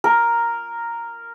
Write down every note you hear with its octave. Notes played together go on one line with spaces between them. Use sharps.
A#4